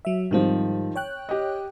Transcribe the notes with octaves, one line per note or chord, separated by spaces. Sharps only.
F#3 E5
G#2 D#3 F3 G3 C4
C#5 G5 F#6
G4 D#5